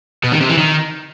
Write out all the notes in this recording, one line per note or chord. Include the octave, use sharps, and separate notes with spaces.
B2
D#3
C3
E3
D#3